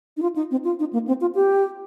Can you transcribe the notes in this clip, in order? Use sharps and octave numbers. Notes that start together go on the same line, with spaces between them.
D#4
F4
D#4
C4
F4
D#4
A#3
C4
F4
G4